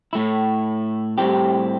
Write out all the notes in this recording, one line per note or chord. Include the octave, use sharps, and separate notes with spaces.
A2 A3 E4
A2 G3 C4 E4 G4